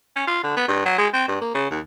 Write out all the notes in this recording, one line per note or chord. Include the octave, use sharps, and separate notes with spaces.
C#4
F4
D3
B3
G2
F#3
G#3
C4
G2
A#3
C#3
D#2